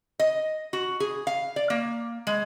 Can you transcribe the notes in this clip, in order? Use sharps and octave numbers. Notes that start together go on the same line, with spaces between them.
D#5
F#4
G#4
F5
D5
A#3
G#3